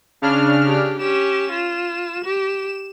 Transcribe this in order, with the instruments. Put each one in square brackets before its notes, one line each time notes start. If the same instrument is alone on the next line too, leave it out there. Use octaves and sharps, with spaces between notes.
[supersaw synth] C#3 D4 F6
[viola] G4
[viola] C#4 G4 [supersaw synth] E7
[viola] F4
G4